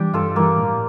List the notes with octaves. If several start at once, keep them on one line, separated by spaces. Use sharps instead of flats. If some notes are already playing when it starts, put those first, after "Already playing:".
Already playing: E3 G3 D4 G4
G2 F4 A4
E3 G3 A#3
A2